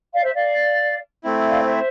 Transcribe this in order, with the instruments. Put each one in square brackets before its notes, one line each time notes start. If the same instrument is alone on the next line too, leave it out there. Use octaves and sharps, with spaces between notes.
[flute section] D5 F5
C5 E5
D5 F5
[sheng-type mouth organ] A3 C4 E4
[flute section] D5 F5
C5 E5